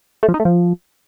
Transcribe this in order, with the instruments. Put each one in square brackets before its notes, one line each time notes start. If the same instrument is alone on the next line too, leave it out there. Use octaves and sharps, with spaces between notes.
[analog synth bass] A3
F3
D#4
A3
F3